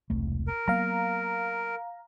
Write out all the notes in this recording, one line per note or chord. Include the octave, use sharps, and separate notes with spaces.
E1 C2 A3
A#4
F#3 A#3 B3 F5 A#5